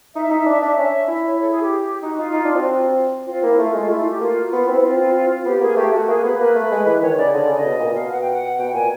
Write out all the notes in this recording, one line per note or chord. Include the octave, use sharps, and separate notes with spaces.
D#4 E5
D#4
D4
D4
C#4 E5
E4
C#5
A4
G#4
G4
D#4 F#4
D#4 F4
D#4
D4
C4 F#4
F4
C4 F4
A#3 E4
A3 F4
G#3 F4
A3 E4
F4
G4
A#3 F4
F#4
B3 F4
C4 E4
B3
C4 F4
F4
F4
F4
B3 G4
A#3 G#4
A3 G4
A3 F#4
A#3 G#4
B3 B4
A#3 B4
A3
G#3
E3
D#3 C#5
C#3 D5
D3 D#5
C#3 D5
D#5
B2
A#2
B2 F5
F#5
G5
F#5
B2 G5
A#2 G#5